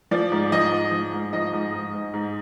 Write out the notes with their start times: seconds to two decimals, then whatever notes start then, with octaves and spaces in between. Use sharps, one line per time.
0.11 F3 D5
0.32 G#2
0.52 F3 D#5
0.72 G#2
0.92 F3
1.13 G#2
1.33 F3 D#5
1.53 G#2
1.72 G#2
1.93 G#2
2.14 G#2